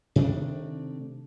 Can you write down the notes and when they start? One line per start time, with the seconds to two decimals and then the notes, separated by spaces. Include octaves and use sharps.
0.16 C3 D#3 A3 D4